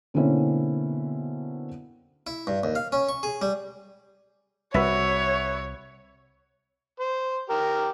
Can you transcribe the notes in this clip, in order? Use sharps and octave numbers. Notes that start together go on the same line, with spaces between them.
B2 D3 A#3 C4 C#4 E4
E4
G2
D#2
F5
C#4
C#6
G#4
G3
C2 F#4 B4 C#5 E5
C5
G4 A#4